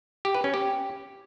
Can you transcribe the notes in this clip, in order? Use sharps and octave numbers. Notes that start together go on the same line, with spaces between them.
G4
B4
C#4
G4